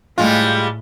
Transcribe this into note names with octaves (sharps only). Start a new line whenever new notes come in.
A2 G3 G#3 F4